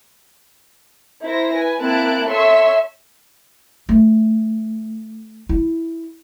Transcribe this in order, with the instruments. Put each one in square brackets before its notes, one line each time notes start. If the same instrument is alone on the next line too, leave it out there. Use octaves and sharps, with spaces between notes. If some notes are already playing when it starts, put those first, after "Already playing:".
[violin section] E4 A#4 C5 A#6
B4 G#5
A#3 C4 E4 A5 F#6 D7
A4 C#5 E5 C6 C#6 E6
[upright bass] A3
E4